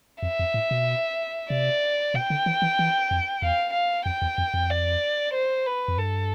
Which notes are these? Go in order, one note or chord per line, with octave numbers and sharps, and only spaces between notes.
F2 E5
F2
A2
B2
C3 D5
B2 G5
D3
E3
E3
E3
F2
E2 F5
F5
F2 G5
E2
F2
F2
D5
C5
B4
F2
G2 A4